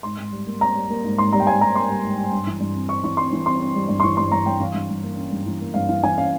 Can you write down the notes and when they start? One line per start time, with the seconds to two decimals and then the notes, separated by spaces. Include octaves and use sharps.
0.03 G#2 C6
0.18 G#2
0.32 G3
0.47 A#3
0.61 G3 A#5
0.75 G3
0.90 A#3
1.04 G#2
1.18 G#2 C6
1.33 G3 A#5
1.40 G5
1.46 G#2 G#5
1.60 G3 A#5
1.75 A#3 C6
1.89 G3
2.03 G#2
2.18 G3
2.31 G2
2.47 E3
2.60 G2
2.74 C4
2.89 C4 C#6
3.04 E3 C#6
3.17 C4 C6
3.33 E3
3.46 C4 C6
3.60 C4
3.75 G3
3.88 G2
4.00 C6
4.03 E3 C#6
4.17 G2 C6
4.32 G2 A#5
4.46 G2 G5
4.60 E3 F5
4.74 G2
4.89 G2
5.03 A#3
5.17 C#4
5.31 G2
5.46 E3
5.60 A#3
5.74 G2 F5
5.89 E3 F5
6.03 E3 G#5
6.17 C#4 F5